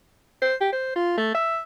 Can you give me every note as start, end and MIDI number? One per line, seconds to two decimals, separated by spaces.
0.42 0.55 72
0.61 0.69 67
0.72 0.94 72
0.96 1.12 65
1.17 1.32 57
1.35 1.60 76